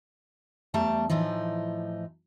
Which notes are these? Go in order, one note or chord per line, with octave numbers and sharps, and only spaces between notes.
E2 G3 A3 A5 A#5
A2 E3 F3 D#4